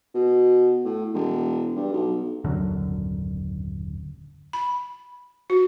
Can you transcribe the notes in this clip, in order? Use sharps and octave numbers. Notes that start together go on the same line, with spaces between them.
B2
A2
E1
G2
B1
D#1 G#1 F#2 D3
B5
F#4